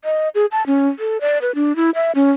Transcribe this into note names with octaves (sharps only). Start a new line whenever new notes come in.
D#5
G#4
A5
C#4
A4
D5
B4
D4
E4
E5
C#4